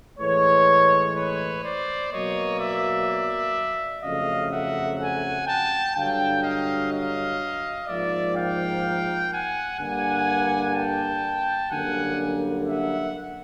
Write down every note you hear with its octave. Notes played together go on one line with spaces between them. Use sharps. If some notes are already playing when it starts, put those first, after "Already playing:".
A2 E3 G#3 B4 C#5
B4 C#5
C5 D5
B2 F#3 A#3 C#5 D#5
D5 E5
F2 C#3 F#3 A3 D#5 F5
E5 F#5
F#5 G#5
G5 A5
G2 D3 F#3 F5 G5
D#5 F5
D#5 F5
G#2 F3 A#3 D5 E5
F5 G5
F#5 G#5
G2 D3 G3 A#3 F#5 G#5
G5 A5
F#2 D3 G3 A#3 F#5 G#5
E5 F#5